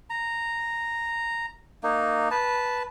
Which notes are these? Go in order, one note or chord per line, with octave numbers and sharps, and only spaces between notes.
A#5
A#3 D#4
B4 A5